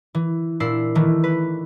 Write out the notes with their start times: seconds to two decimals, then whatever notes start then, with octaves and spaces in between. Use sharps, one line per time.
0.15 E3
0.60 A#2 D4 E4 C7
0.95 D#3 E3 A3
1.24 B4